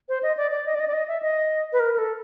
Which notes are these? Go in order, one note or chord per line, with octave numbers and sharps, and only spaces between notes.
C5
D#5
D5
D5
D#5
D5
D#5
D5
D#5
E5
D#5
B4
A#4
A#4
A4